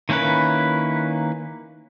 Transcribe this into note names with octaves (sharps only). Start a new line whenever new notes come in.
D#3 A#3 C#4 E4 B4